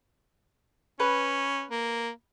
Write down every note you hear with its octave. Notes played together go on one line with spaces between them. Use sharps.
C#4 B4
A#3